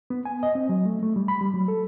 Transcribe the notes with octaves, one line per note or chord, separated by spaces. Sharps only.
B3
G#5
D#5
C4
F#3
A3
A3
G3
B5
G3
F#3
A4